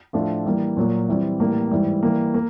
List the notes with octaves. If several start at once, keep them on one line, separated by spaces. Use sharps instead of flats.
A2 F3 A3 D4 F4
E3 G3 A#3
A#2 F#3 A#3
E3 G3 C4
A2 E3 G3 A#3
G#2 E3 G3
E3 G3 A#3
A#3